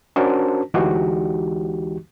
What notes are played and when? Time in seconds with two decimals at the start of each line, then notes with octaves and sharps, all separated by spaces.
0.16 C#4 D4 F#4 A#4 C5 A5
0.74 D2 E3 G#3 D#4 F#4 G4